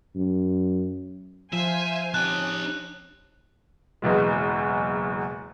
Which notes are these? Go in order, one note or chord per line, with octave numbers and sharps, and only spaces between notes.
F#2
F3 C5 E5 F5 G#5
C3 C#4 D#4 A5 F#6
F#1 E2 B2 G#3